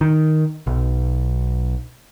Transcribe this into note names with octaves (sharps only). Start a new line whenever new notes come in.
D#3
B1